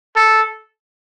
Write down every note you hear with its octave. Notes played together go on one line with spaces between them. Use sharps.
A4